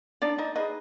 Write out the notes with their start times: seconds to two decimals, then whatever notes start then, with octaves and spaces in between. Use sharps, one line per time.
0.22 D4 D#4 D5
0.38 D#4 D#5
0.55 D#4 G#4 B4 D#5